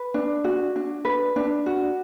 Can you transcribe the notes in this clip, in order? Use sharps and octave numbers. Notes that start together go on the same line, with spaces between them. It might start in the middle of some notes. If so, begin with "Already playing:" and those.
Already playing: B4
D4
F#4
D4
B4
D4
F#4